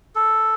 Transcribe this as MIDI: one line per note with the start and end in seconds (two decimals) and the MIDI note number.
0.15 0.55 69